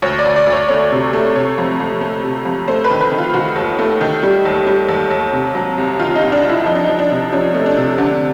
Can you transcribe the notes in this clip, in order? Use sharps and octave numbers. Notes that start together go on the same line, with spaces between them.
D2 C#5
D5
D2
D5
D2
C#5
A3 C#5
C3
A3
C3 C#5
F2
F2
A3
C3
F2
A3 C5
B4
D#3
B4
D#3
F4
D#3 F#4
D#2
A3
D#3
G3
D#2
G3
D#2
D#2
C3
F#3
C2
D#3 F4
D#4
C2
D4
C2 E4
F3 D#4
D4
F3 D#4
D4
C3
F3 C#4
A3
D4
C3
D3